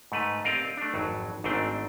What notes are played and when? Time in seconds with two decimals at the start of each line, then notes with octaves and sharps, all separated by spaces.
0.12 G#2 A3 B4
0.44 C4 G4 A#4 D5 D#5 F5
0.77 A3 D4
0.94 G#1 F2 F#3
1.44 G#1 G#2 A3 C4 D4 G5